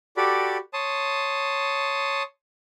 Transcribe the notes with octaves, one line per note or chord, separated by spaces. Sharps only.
F#4 G4 A4 D5 B5
C#5 A5 C6 D#6